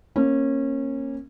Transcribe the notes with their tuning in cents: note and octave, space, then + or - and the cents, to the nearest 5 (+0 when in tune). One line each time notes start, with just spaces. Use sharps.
A#3 +0 C#4 -25